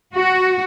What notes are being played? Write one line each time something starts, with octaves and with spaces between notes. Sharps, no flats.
F#4